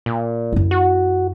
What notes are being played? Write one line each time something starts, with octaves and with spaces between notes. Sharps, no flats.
A#2
F#2 E4
F#4